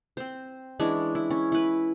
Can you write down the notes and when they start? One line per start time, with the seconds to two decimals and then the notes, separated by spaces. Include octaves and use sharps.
0.17 C4 C5
0.80 E3 G#3 C#4 D4
1.15 E4
1.31 C#4
1.52 E4 B4